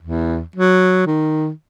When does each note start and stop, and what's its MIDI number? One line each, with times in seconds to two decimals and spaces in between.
0.02 0.41 40
0.56 1.03 54
1.07 1.50 51